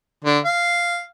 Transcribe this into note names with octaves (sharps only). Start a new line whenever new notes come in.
D3
F5